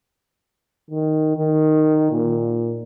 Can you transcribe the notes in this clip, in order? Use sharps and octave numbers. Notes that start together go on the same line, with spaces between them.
D#3
D#3
A#2